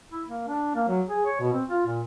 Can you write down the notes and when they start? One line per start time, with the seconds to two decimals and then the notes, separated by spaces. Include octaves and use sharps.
0.11 E4
0.29 A#3
0.48 D4
0.76 A#3
0.88 F#3
1.08 G#4
1.26 C#5
1.40 B2
1.53 C4
1.69 F4
1.86 A#2